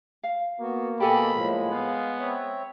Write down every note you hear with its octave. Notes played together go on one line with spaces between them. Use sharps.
F5
A#3 B3 F#4
B2 G4 A4 D#5 G#5 A5 B5
A2 F3 G#3 A#3
B3 F5
C4 C#5 E5